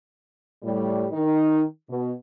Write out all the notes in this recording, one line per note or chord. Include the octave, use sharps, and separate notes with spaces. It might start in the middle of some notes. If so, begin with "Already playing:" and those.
A2 G3
D#3 D#4
B2